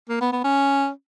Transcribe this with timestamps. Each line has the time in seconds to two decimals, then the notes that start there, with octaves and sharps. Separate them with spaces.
0.09 A#3
0.21 B3
0.33 B3
0.44 C#4